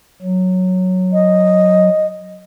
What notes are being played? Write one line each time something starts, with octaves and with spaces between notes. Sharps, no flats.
F#3
D#5